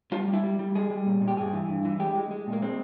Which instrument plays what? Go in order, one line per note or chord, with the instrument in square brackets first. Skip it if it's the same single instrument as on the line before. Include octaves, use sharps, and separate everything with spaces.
[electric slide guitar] G3 F4
G3
E4
G3
G3
G3 G#4
G3
A#2
A#2
G4
G2 G#4
E3
G2
E3
G#3 G4
G#3
G#3
A#2
A#3
G#3 C4